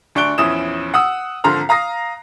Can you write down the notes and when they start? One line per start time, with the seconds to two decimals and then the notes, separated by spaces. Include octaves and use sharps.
0.15 D2 D4 C#6 F#6 D7 G7
0.38 A#1 E2 C#4 E4 D#6 E7
0.94 F#5 D#6 E6
1.44 G#1 D3 F3 A#5 C6 F6
1.69 F5 A#5 D#6 A#6 C7